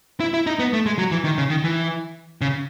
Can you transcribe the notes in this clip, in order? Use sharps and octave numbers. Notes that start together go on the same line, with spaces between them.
E4
E4
D#4
B3
A3
G#3
F#3
E3
D#3
C#3
D#3
E3
C#3